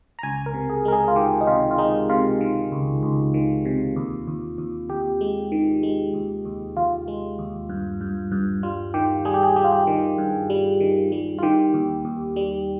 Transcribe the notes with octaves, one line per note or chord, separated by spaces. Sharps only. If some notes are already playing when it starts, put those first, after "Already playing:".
A#5
C#2 G#5
A#4
C3
G#4
G#3 A#4
G#4
F4
D#3 G4
D#4
C3 F4
F4
G#3 D#4
C3 F4
D#3
C#2
C#2
D#3
C3
D#2
D#2
D#2
D#2 G4
G#3
D#3
G#3
D#2
D#2
D#2 F4
G#3
D#2
G2
G2
G2
G3 F4
D#3 G4
G3 G#4
G4
G#4
G3 G4
F4
G4
D#3
G2
G3
D#3
G3
F4
D#3 G4
D#2
D#2
G3